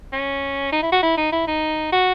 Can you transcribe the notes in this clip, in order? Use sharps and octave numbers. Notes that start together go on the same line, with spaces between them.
C#4
D#4
E4
F#4
E4
D#4
E4
D#4
F#4